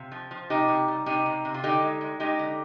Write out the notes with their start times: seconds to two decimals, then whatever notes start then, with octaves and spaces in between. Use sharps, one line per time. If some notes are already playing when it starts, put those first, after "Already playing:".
Already playing: C3 F4
0.12 F3
0.31 F3
0.50 C3 D#4 G4
0.69 C3
0.88 G3
1.06 C3 D#4 G4
1.26 C3
1.45 C3
1.54 F4
1.64 D3 D#4 G4
1.82 G#3
2.01 G#3
2.20 G#3 D#4 G4
2.39 D3